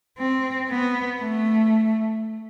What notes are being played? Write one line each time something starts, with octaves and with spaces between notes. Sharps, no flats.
C4
B3
A3